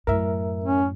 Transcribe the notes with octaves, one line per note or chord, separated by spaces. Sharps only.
F#2 A2 A#4 E5
C#4